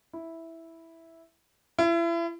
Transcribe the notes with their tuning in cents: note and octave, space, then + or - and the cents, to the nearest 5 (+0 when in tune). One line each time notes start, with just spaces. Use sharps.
E4 -5
E4 +35